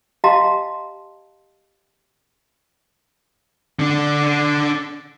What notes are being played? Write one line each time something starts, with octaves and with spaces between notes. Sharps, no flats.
G4 D#5 F5 A5 A#5 C6
D3 D4